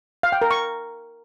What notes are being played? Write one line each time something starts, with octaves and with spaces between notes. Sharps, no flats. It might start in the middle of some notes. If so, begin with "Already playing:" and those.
F5
G5
A#4
C#6